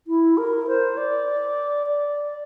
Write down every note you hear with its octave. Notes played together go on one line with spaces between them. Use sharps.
E4
A#4
C5
D5
D5